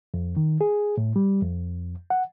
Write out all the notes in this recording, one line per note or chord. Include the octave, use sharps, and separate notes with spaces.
F2
D#3
G#4
A2
G3
F2
F#5